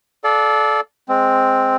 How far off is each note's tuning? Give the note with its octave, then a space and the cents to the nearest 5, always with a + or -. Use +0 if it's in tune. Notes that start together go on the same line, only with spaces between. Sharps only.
A4 -25 D5 +0 F5 +0
G#3 +0 C4 +0